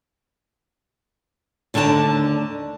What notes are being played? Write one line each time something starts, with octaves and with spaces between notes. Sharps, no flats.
D#2 D3 A3 D4 A5 A#5